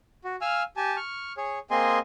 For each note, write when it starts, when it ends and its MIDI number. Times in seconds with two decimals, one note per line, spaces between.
0.24 0.36 66
0.41 0.63 77
0.41 0.63 80
0.41 0.63 88
0.41 0.63 89
0.77 0.96 67
0.77 0.96 80
0.77 0.96 81
0.97 1.33 85
0.97 1.33 89
1.37 1.59 68
1.37 1.59 73
1.71 1.99 58
1.71 1.99 60
1.71 1.99 68
1.71 1.99 75
1.71 1.99 80
1.71 1.99 84